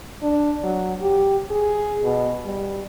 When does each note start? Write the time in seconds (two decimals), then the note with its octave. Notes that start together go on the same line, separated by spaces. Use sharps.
0.22 D4
0.63 F#3
1.02 G4
1.50 G#4
2.03 B2
2.45 G3